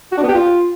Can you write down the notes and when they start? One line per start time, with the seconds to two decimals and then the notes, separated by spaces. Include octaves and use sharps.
0.12 F#4
0.17 D4
0.23 B3
0.28 G4
0.34 F4